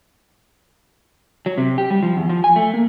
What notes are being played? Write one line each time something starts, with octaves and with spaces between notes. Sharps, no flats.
F#3
C3
G4
G3
F3
E2
F3
G#5
A3
A#3